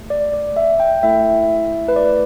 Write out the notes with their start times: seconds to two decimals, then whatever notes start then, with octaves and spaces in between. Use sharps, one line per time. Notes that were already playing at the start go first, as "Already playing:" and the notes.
Already playing: A3 G4
0.10 D5
0.33 D5
0.56 E5
0.80 G5
1.03 A3 E4 A4 E5
1.88 B4
1.96 D5